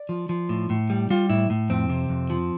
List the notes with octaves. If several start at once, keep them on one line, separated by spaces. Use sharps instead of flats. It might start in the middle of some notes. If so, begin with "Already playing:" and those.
Already playing: D5
F3
F3
A2
A2
G3
G3 F4
A2 E4
A2
F2 C4
C3
F2
F3